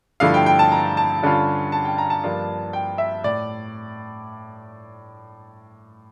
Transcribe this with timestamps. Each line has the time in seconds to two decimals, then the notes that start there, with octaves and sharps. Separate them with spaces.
0.20 G2 D3 F3 A3 E4 F5
0.34 G5
0.46 G5
0.59 A5
0.72 A#5
0.97 A5
1.22 G2 D3 G3 C#4 F4
1.72 A5
1.85 G5
1.98 A#5
2.10 A5
2.24 G2 F3 A#3 D4 F4
2.73 G5
2.98 E5
3.24 A2 D5